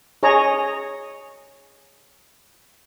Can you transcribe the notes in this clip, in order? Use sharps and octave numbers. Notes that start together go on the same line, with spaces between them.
G#4 C#5 D#5 A#5